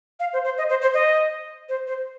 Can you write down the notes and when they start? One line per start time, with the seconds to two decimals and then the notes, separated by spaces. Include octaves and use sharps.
0.20 F5
0.33 C5
0.44 C5
0.58 D#5
0.70 C5
0.82 C5
0.94 D#5
1.69 C5
1.87 C5